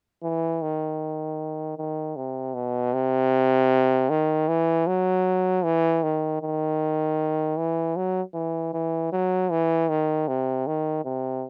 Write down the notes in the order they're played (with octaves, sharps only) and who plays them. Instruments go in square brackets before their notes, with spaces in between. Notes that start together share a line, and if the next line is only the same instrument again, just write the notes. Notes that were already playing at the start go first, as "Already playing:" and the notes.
[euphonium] E3
D#3
D#3
C3
B2
C3
D#3
E3
F#3
E3
D#3
D#3
E3
F#3
E3
E3
F#3
E3
D#3
C3
D#3
C3